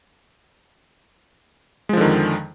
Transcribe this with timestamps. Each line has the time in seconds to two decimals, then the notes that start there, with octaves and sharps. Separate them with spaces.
1.89 G#3
1.93 F3
1.97 D3
2.01 D#3
2.05 F2